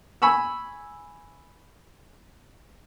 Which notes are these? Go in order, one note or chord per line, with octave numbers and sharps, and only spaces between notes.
G#5 B5 C#6 E6